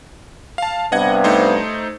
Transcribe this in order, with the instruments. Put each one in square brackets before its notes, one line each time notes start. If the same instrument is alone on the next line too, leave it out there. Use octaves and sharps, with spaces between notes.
[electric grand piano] F5 A5
[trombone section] G2 C3 B3 [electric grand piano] D#5 F#5 G#6
[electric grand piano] A3 D#4 C5